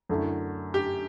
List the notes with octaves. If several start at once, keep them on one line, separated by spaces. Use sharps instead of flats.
F#2 D3 A3 E4
G4